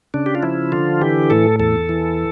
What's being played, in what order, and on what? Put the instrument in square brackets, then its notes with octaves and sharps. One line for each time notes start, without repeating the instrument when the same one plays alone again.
[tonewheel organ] C#3 D4
G4
F4
F3 E4
D3 F4
E3 G4
A2 A4
E2 A4
E3